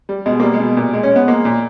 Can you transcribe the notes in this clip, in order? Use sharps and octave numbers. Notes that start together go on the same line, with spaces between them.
G3
B2 G#3
G3 A#3
G#3
B2
A#2
G#3
C#4
G#3 B3
G#3 A#3
A#2